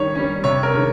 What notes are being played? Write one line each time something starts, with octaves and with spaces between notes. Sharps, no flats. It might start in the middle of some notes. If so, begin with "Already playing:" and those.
Already playing: D#3 G3 C#4 C#5
G3 C#4
C3 C#5
A#4
D#3 G#3 C#4